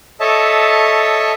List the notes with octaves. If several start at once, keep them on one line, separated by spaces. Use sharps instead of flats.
A4 C#5 D#5 E5 A5